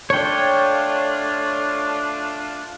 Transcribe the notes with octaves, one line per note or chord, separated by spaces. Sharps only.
A3 D4 F4 C#5 G5